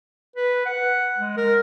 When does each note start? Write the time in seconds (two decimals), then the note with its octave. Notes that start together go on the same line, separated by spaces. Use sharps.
0.36 B4
0.65 F#5
1.18 G#3
1.37 A#4